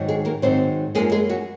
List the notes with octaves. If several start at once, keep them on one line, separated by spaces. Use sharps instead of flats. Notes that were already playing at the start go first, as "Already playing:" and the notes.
Already playing: G#2 D#3 F#3
G#3 G#4
A#3 A#4
G#2 D#3 F#3 C4 C5
F#2 F3 G#3 A#3 G#4
G#3 G#4
F#3 F#4